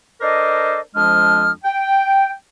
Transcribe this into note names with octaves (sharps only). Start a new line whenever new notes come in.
D4 A4 A#4 C5 D#5 D6
F2 F3 G#3 D4 D#6 F6
G5